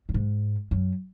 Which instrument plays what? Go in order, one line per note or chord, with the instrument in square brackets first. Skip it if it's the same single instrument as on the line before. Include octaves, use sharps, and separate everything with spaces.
[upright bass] F#2
G#2
F#2